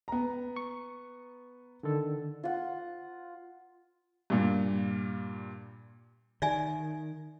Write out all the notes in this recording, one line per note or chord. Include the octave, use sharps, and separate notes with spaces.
B3 A#5
C#6
D3 D#3 A4
F4 F#5
G2 A#2
D#3 D5 E5 G#5